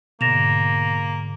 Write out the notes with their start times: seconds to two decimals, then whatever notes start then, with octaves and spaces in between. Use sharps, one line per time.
0.21 G#2 B2 D3 A#3 A6 A#6 E7 F7